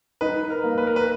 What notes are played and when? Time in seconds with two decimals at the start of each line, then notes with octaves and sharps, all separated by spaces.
0.21 D#4 B4
0.50 A#4
0.63 A#3
0.78 B4
0.87 A#4
0.96 B4